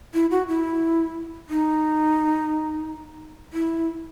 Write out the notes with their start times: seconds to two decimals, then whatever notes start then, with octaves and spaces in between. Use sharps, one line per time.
0.14 E4
0.31 F#4
0.48 E4
1.49 D#4
3.53 E4